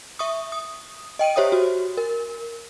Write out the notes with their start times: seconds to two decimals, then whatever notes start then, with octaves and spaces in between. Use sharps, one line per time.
0.19 E5 C#6 D#6
0.52 D#6
1.19 D#5 G5 D7 D#7
1.36 G4 C5 C#5 E5 D#6
1.52 F#4
1.97 A#4